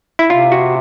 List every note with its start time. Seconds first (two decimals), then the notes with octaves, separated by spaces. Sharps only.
0.19 E4
0.29 C3 F4
0.52 F#4